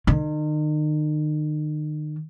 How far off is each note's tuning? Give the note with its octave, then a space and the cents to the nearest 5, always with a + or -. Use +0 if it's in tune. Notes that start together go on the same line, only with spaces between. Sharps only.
D#3 -40